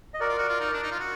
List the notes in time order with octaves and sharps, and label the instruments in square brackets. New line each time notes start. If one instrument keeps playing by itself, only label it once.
[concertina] D#5
[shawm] F#4 [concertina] A#4 D5
[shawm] F4
F#4
F4
D#4
D4
D#4
F4
F#4